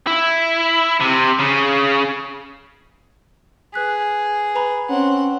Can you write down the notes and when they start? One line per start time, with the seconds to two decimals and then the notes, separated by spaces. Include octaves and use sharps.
0.07 E4
1.00 C3
1.39 C#3
3.74 G#4 B4 F#6 B6
4.55 B4 A#5 B5
4.89 C4 C#4 F#5